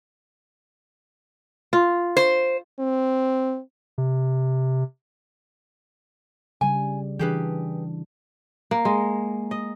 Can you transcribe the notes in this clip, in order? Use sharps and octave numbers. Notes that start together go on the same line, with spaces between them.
F4
C5
C4
C3
C#3 G3 G#5
E3 D4 G4 G#4 B4
A#3
G#3
D#5